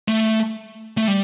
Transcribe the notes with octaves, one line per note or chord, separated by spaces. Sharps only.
A3
A3
G3